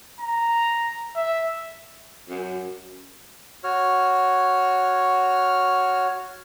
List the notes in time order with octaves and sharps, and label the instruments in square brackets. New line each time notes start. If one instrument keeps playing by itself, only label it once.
[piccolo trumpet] A#5
E5
[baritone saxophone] F#2
[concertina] F#4 C#5 F6